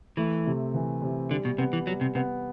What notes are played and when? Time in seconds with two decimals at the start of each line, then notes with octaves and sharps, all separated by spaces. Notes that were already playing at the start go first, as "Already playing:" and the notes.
0.17 E3 A3
0.46 C3
0.74 E3
1.02 C3
1.30 D3 G3
1.45 B2
1.58 C3 B3
1.73 E3
1.87 F#3 G3
2.01 C3
2.15 C3 B3